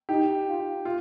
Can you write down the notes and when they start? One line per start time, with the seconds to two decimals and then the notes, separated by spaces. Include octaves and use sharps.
0.09 D#4 G4
0.48 F4
0.85 F4